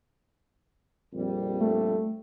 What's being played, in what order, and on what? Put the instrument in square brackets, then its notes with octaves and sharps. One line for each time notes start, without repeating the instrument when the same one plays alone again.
[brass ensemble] A#1 F2 G3
[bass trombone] A3